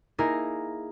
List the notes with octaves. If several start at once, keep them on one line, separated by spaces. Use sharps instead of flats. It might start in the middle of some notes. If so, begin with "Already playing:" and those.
A#3 D#4 E4 G#4 A#4